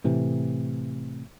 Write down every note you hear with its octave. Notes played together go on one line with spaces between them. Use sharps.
A2 C3 E3